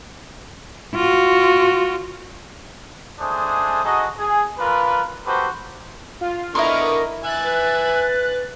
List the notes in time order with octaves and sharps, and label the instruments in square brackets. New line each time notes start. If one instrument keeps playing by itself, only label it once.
[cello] F4 F#4
[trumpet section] G#3 A3 D4 G#4 C5 D#6
D#4 F#4 G#4 A4 D#5
G#4
D4 F4 A#4 B4
D#4 F#4 G4 A4 B4 C5
[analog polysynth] F4
[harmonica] D3 B3 C#6 [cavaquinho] E4 C6 [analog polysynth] A#4 D#5
[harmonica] E5 G#5 [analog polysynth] F#6 A6
[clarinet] B4